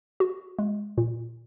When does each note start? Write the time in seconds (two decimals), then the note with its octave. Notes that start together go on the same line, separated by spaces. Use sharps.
0.20 F#4
0.59 G#3
0.98 A#2